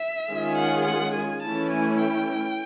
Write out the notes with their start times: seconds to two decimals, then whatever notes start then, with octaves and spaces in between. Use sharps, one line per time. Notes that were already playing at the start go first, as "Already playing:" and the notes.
Already playing: E5
0.29 D#3 G#3 C#4 F4 G#4
0.57 F#5
0.85 F#5
1.15 G#5
1.42 E3 A3 C#4 E4 A5
1.71 G#5
2.00 G5